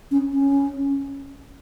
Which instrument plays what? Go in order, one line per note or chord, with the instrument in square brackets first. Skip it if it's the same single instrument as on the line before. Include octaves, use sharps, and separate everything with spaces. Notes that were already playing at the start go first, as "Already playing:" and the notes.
[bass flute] C#4
C#4